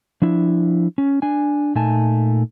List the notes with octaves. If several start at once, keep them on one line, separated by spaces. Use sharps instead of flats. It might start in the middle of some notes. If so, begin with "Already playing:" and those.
F3 D4 E4
C#4
D4 G#5
A#2 A3 D#4 G#5 A5